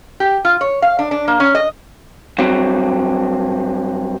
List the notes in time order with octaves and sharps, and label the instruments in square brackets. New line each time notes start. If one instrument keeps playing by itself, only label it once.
[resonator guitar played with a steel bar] G4
F4
C#5
F5
D4
D4
A#3
C#4
D#5
[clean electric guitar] G2 F#3 C4